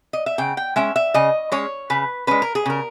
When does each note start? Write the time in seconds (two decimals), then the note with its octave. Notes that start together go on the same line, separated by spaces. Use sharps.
0.13 D#5
0.26 E5
0.38 C#3 G5
0.57 G5
0.76 G#3 C#4 E5
0.96 E5
1.14 C#3 D#5
1.52 G#3 C#4 C#5
1.90 C#3 B4
2.27 G#3 C#4 B4
2.42 A#4
2.55 G#4
2.66 C#3 A#4